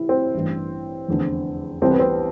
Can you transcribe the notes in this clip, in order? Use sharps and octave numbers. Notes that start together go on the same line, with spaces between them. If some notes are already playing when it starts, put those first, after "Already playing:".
Already playing: C3 E3 E4
C4
A1 G2 E3
F1 E2 D3
C2 C3 E3 C4
B3
C4